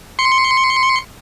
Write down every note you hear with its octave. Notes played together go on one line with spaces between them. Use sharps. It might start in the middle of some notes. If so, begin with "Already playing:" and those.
C6 C#7